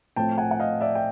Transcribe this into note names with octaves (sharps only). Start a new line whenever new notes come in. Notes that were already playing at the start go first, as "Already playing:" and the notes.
A2 F3 A3 C4 G5 A5
F#5 G#5
F#5
D#5 F5
D5 E5
G5